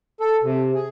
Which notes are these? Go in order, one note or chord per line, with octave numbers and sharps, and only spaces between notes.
A4
C3
G#4